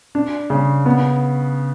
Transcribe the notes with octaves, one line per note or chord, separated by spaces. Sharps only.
D4
C#3
B3